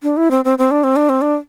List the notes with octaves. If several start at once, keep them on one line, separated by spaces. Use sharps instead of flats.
D4
E4
C4
C4
C4
D4
C4
D4
C4
D4